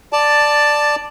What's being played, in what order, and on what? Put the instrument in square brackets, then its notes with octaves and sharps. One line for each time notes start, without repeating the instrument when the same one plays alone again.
[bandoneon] D5 A5